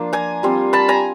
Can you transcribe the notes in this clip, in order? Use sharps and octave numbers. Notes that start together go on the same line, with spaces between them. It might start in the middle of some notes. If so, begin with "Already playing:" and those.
Already playing: F3 A#3 D4 F4
G#5 A#5
G3 C4 F4
A5 B5
G#5 A#5